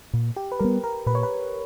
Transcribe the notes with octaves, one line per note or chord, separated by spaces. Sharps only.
A#2
G4
B4
G3 B3 A#4
A#4
A#2 B4
C#5
B4